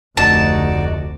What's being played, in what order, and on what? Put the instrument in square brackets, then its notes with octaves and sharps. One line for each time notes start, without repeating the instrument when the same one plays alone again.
[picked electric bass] F1 [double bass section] D2 [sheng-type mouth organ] D#4 F#4 D5 [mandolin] A5